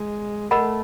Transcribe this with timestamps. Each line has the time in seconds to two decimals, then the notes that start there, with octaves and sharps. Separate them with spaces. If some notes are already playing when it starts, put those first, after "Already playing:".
Already playing: G#3
0.51 A3 A#4 D#5 F#5 B5